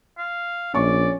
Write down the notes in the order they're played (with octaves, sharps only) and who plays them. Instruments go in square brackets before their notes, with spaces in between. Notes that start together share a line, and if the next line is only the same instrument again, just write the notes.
[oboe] F5
[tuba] A#1 [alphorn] C#4 [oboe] D5 [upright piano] C#6